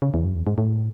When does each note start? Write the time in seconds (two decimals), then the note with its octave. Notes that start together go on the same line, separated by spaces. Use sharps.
0.02 C#3
0.14 E2
0.25 F#2
0.35 E2
0.47 G#2
0.58 A2